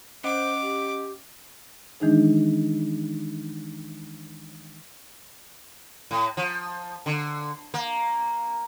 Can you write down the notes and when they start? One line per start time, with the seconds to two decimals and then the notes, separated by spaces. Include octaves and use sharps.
0.24 C#4 C5 D#5 F#5 D6
0.62 G4
2.00 D#3 E3 G#3 D4 D#4 G#4
6.11 A2
6.37 F3
7.06 D3
7.74 A#3